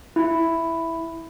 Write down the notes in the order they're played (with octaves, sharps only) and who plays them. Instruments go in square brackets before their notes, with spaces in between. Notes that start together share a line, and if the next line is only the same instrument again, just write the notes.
[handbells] E4